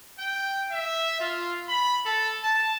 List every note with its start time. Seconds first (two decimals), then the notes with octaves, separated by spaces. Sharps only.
0.19 G5
0.71 E5
1.20 F4
1.68 B5
2.05 A4
2.43 A5